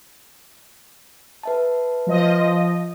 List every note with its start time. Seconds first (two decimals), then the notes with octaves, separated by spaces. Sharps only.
1.43 B4 E5 A5
2.07 F3 D#5